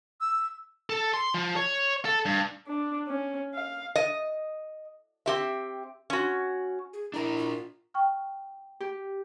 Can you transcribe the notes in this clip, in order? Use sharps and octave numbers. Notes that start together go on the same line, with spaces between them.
E6
A4
C6
F3
C#5
A4
G2
D4
C#4
F5
D#5
C4 G4 E5
C#4 F#4
G#4
D4 E4 A#4 A#5
F4
G5 C#6 F6
G4